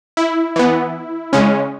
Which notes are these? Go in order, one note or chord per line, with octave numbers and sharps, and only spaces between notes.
E4
E3 B3
C#3 G#3 C#4